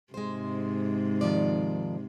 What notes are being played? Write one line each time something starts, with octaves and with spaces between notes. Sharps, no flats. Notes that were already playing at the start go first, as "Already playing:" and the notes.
G#2 C3 G#3 C5
D#3 F3 D5